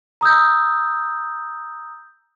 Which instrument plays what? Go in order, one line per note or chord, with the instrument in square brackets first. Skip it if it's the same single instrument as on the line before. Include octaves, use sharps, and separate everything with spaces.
[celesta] A#5 D#6 E6 G6